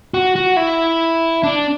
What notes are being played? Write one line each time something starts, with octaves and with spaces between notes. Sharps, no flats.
F#4
F#4
E4
D4